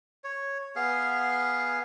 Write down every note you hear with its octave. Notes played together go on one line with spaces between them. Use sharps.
C#5
B3 G#4 F5